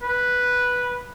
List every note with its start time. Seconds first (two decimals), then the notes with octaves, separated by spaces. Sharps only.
0.02 B4